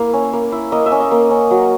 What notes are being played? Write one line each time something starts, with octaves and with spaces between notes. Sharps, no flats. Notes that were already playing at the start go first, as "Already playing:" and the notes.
Already playing: A#3 E4
C#4
A#3
E4
A#3 D#5
E5
C#4
D#5
A#3
C#4
F#3